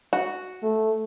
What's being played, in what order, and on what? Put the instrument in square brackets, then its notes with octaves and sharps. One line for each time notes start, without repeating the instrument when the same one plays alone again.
[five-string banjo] F#4
[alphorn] A3